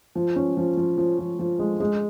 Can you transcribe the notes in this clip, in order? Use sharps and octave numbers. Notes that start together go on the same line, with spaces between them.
F3
C#4
F3
F3
F3
F3
F3
G#3
G#3